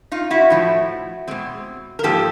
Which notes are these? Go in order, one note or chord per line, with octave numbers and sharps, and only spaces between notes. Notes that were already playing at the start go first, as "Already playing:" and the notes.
D#4 F4
E4 F#4
A2 F3 A3
B2 G#3 C4
A#4
G#2 F3 A#3 G4 A4